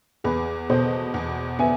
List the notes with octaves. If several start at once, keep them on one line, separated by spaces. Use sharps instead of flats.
E2 G#4 B4
B2 A4 C5
E2
B3 E5 G#5